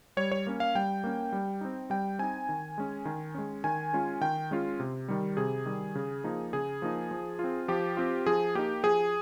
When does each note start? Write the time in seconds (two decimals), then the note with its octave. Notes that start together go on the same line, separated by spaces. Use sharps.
0.17 G3 C#5
0.32 C#5
0.47 A#3 C#4
0.60 F5
0.75 G3 G5
1.04 A#3 C#4
1.33 G3
1.61 C4 D#4
1.90 G3 G5
2.19 C4 D#4 G#5
2.49 D#3
2.78 G#3 C#4
3.05 D#3
3.35 G#3 C#4
3.64 D#3 G#5
3.93 G#3 C#4 F4
4.21 D#3 G5
4.51 G#3 C#4 F4
4.80 C3
5.08 D#3 G3
5.37 C3 G#4
5.66 D#3 G3
5.95 C#3
6.24 F3 A#3 D#4
6.53 C#3 G#4
6.82 F3 A#3 D#4
7.11 F3
7.39 C4 F4
7.68 F3 G4
7.97 C4 F4
8.26 F3 G#4
8.55 A#3 D#4 G4
8.83 F3 G#4